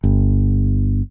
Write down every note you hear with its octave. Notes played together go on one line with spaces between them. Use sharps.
G1